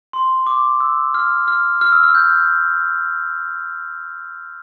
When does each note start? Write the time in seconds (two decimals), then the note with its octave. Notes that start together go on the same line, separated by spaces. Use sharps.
0.13 C6
0.47 D6
0.80 E6
1.14 F6
1.48 F6
1.81 F6
1.92 E6
2.03 F6
2.15 G6